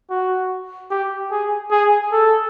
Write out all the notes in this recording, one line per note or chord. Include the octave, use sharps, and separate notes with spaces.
F#4
G4
G#4
G#4
A4